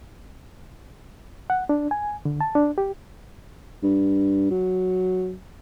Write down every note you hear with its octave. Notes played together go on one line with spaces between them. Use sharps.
F#5
D4
G#5
D3
A5
D4
G4
G2
F#3